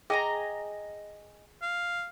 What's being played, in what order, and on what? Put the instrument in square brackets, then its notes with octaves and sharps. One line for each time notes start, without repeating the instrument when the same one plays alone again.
[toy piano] G#4 G5 [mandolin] D#5 G#5 A#5
[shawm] F5